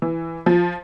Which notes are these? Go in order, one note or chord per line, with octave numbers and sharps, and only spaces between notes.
E3
F3